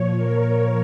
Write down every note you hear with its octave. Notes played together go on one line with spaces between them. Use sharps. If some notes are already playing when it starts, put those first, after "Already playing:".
Already playing: A#2 F3 C#5
A#4